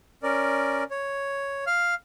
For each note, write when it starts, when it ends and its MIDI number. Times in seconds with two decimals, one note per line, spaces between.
0.23 0.84 61
0.23 0.84 70
0.23 0.84 74
0.91 1.65 73
1.67 1.94 77
1.67 1.94 89